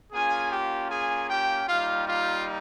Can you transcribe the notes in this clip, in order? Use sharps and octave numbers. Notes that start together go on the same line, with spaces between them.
A#3 C#4 F4 G#4 G#5
G4 G5
G#4 G#5
G4 G5
G3 A#3 D#4 F4 G4 F5
F4 F5